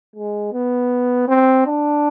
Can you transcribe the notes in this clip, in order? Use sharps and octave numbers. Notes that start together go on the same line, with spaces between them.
G#3
B3
C4
D4